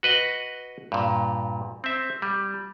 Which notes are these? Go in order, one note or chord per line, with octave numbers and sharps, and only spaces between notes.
F#4 B4 D#5
G2 A#2
C4 E5
G3